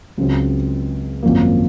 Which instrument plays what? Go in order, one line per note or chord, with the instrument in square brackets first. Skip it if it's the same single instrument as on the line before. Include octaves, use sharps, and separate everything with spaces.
[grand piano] C#2 C#3 F#3 C4
G#1 F#2 F3 A#3